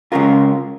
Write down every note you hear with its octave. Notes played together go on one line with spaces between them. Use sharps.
C#3 G#3 C#4 F4 A#4